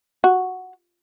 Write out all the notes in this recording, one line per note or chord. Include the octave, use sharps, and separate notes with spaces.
F#4